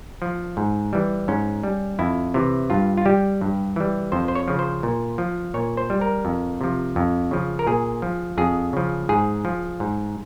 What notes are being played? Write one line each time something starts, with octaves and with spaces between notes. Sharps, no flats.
F3
G#2
E3 G3
G#2 C#4
G3
F2 E4
C3 E3
G2 F4
F4
G3 G4
G2
E3 G3
F2 C5
C5
C#5
C#3 F3
C5
A#2
F3
A#2 C#5
C5
G3
A#4
F2
C3 F3
F2
C#3 F3
A#4
A#2 G#4
F3
F2 G#4
C#3 F3
G#2 G#4
F3
G#2